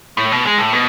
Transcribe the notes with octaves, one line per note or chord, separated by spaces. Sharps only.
A2
B2
G#3
A2
B2